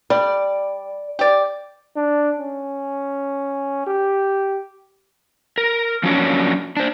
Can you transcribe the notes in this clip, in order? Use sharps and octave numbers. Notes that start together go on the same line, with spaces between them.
G3 D5
G4 D5
D4
C#4
G4
A#4
F3 F#3 A#3 C#4 D4 C#5
D4 C5